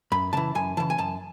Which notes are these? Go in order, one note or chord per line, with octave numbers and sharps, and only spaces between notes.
F#2 B5
C#3 E3 A5
F#2 G#5
C#3 E3 A5
G#5
F#2 A5